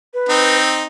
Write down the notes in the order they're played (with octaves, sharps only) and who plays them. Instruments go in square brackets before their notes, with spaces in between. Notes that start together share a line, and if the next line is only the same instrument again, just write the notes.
[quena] B4
[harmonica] C4 D#4